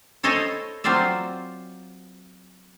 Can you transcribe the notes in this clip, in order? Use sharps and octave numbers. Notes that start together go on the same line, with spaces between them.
E4 A4 C5 C#5 D#5
F#3 C4 F4 C5 D5 E5